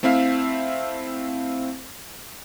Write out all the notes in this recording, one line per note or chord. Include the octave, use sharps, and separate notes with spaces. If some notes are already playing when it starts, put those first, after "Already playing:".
A3 C4 E4 E5 F5